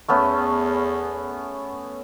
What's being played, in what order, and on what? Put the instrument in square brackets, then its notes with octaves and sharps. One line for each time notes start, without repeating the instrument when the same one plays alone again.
[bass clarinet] E2 [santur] A3 B3 C#4